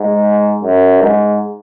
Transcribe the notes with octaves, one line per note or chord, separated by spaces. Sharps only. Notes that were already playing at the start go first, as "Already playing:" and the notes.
Already playing: G#2
F#2
G#2